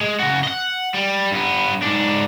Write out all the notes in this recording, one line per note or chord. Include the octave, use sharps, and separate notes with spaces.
G#3
C#3 F#4
D#5 F#5
G3
G2 B3
G#2 D4